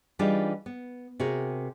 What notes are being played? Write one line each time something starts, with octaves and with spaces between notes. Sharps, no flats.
E3 G3 D4 D#4 F4 G#4
B3
C3 F#4 G#4 A#4